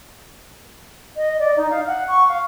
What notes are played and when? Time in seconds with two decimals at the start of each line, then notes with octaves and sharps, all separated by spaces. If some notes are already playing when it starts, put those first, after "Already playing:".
1.16 D#5
1.39 D5
1.56 D#4
1.70 F5
1.87 F#5
2.08 C#6
2.28 F5